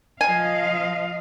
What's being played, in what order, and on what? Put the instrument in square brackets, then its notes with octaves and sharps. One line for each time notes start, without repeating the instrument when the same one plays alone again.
[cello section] F3 D#5 F5 [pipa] G#5